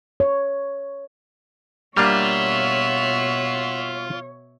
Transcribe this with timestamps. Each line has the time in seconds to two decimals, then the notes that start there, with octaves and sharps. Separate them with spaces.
0.20 C#5
1.97 B2 G3 A#3 D4 F4 C#5 E5 F#5